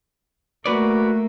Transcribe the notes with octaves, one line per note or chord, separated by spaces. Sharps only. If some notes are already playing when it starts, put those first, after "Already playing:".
A3 A#3 F#4 B4 D5